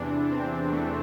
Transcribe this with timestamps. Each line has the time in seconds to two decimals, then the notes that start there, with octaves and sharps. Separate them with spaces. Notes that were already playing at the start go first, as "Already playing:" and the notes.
Already playing: E2 C3 E3 D4
0.30 C4
0.72 A3